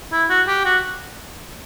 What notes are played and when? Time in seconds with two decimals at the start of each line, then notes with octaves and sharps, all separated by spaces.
0.12 E4
0.29 F#4
0.47 G4
0.65 F#4